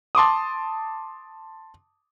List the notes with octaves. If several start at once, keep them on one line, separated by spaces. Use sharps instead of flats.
A5 C6 D6 D#6